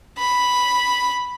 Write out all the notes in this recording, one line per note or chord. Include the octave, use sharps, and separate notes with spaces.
B5